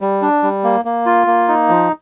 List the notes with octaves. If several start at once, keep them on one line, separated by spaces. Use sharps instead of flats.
G3
D4
G3
A#3
A#3
F4
A#3
D#4
F3